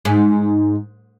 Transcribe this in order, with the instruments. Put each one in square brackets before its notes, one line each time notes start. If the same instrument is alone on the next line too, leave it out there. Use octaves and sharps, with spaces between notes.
[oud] G#2